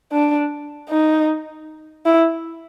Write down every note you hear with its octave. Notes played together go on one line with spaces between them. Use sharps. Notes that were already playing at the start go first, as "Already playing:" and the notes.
D4
D#4
E4